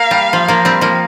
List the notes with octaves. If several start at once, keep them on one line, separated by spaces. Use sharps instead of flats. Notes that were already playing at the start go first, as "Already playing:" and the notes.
Already playing: A#3 F5
G3
F3
F3 A#3
G3 C4
F3 A#3